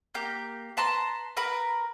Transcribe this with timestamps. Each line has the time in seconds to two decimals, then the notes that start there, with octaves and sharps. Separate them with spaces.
0.15 A#3 G4 G6
0.77 B4 A5 A#5 C6
1.37 A#4 B4 A#5 B5